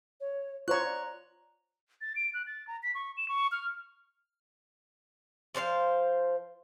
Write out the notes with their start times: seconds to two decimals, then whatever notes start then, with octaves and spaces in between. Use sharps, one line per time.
0.20 C#5
0.68 F4 C5 C#5 A#5 C#6 F#6
0.84 D5
2.01 A6
2.16 D7
2.34 F#6
2.47 A6
2.68 A#5
2.83 B6
2.95 C#6
3.17 E7
3.29 C#6
3.52 F6
5.55 F3 C5 C#5 F5